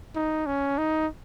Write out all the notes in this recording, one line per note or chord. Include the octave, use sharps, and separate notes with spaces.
D#4
C#4
D#4